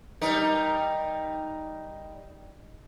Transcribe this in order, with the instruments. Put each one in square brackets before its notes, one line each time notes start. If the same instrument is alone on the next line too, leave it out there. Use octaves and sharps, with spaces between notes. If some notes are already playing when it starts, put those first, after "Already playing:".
[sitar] G3 D#4 A#4